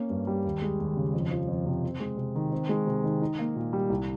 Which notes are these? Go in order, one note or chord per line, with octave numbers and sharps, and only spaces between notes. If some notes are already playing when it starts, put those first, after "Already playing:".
Already playing: A#3 C#4
G2
G3
D#2
G#3
D#2
C#3
F2
F3
F2
C3
C4
G#3
C3
D#3
C4
G#3
C3
D#3
D#4
A#3
A#2
G3
C2